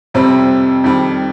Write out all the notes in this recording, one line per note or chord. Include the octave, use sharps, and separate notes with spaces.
F2 C3 G3 C4
F2 D#3 G3